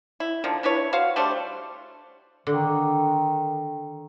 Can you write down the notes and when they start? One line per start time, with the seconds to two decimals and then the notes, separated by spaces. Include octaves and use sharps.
0.20 E4
0.44 D3 D#3 F3
0.63 D4 E4 B4 C#5
0.93 F#4 C5 F5
1.16 G3 A3 D4 C5
2.47 D3 D#3